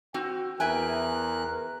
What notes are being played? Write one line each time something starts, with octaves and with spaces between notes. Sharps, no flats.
C4 F#4 G5
E2 E3 A#4 E5 G5 G#5 F#6